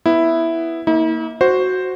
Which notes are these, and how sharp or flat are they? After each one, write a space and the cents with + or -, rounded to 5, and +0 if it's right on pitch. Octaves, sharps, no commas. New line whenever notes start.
B3 +0 E4 +0
A#3 +0 E4 -45
F#4 +0 C5 +0